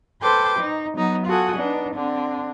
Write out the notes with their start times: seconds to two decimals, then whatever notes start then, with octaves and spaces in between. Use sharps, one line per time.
0.22 A4 B4 C5 G5 C6 D6
0.59 D#4
0.96 F#3 B3 D#4
1.27 F4 F#4 A4 F#5 G#5 D#6
1.56 B3 D4 D#4
1.94 D3 C4 D4